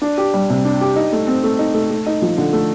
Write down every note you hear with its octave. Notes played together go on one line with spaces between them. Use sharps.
D4
G4
G3
C3
D4
G4
D#4
A3
C4
A3
D#4
A3
A3
D#4
F3
D3
A3